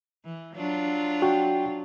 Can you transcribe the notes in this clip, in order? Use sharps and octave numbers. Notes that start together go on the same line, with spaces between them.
E3
F#3 D4 F4
F#4 G5